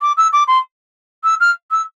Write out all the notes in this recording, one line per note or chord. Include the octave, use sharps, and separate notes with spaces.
D6
E6
D6
C6
E6
F6
E6